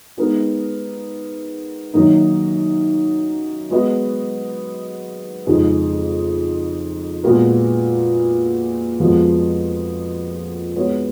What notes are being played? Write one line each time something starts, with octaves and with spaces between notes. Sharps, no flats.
G#3 B3 D#4 A#4
F#2 D#3 F#3 A#3 D#4
G#3 B3 F#4 B4 D#5
F2 C#3 G#3 D#4 G#4
A#2 G#3 B3 F#4 A#4
F2 F3 G#3 B3 F#4
G#3 B3 F#4 C#5